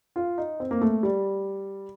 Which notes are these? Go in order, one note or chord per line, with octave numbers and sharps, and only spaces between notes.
F4
D#4
C4
A#3
A3
G3